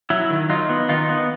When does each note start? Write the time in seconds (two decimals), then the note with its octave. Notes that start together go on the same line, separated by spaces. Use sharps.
0.10 F#3 E4
0.30 D#3
0.50 F#3 D#4 F4
0.69 B3
0.89 D#3 D#4 F4
1.09 B3